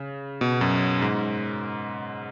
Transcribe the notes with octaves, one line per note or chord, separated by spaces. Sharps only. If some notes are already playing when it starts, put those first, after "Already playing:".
Already playing: C#3
B2
F#2
G#2